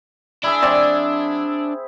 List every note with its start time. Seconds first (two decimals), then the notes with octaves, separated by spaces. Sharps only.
0.44 D4 E4 G#4 E5
0.62 F#3 C4 D5